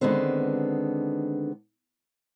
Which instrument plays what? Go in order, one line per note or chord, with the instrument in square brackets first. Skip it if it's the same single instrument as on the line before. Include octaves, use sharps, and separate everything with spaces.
[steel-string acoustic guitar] D3 D#3 G#3 B3 C4